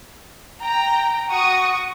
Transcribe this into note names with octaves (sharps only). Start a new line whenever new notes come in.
G5 A#5
F#4 F#5 C#6 D#6